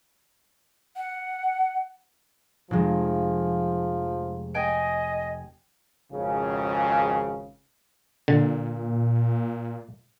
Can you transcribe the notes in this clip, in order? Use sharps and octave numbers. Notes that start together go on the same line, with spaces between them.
F#5
F1 F3 G#3
D#5 G5 G#5 D7
G#1 F2 C#3
A#2 D3